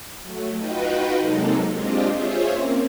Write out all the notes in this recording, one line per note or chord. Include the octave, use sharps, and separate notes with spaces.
F#3 A3
D#4 F4 F#4 B4 D#5 G5
C3 F#3 G#3 A#3 D#4 A4
G#3 C4 D4 F4 G4 D#5
F4 G#4 C5 C#5 E5
A#3 C4 C#4